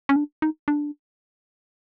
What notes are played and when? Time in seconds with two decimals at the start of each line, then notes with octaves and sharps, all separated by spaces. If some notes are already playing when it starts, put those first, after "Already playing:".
0.09 C#4
0.16 D4
0.42 D#4
0.68 D4